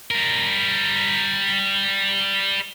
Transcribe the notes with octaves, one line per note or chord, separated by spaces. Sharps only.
G3 A#4